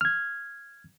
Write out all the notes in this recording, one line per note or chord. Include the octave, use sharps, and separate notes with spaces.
F6 G#6